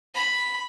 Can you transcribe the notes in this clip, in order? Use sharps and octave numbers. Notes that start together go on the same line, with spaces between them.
B5